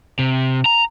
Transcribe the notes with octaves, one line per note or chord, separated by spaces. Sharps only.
C3
A#5